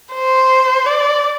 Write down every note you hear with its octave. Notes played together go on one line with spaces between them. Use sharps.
C5
D5